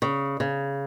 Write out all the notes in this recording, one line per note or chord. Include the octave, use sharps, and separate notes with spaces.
C#3
C#3